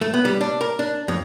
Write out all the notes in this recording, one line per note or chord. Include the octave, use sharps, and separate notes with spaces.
A3
B3
G3
D4
A#4
D4
F2